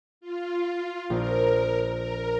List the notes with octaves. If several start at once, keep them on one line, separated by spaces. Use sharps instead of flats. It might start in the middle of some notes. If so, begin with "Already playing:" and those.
F4
A#1 A#4
A#4